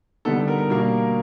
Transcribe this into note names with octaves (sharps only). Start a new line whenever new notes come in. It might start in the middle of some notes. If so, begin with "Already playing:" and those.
D3 G3 B3 D#4 A4
A#4
A#4
B2 G3 A#3 D4 A#4